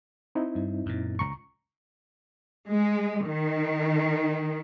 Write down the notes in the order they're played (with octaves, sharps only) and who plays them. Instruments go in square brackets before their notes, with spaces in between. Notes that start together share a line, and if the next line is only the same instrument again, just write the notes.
[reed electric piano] C4 D#4 E4
[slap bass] G2
F#2 A#2
[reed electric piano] C#2 A#5 C#6
[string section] G#3
D#3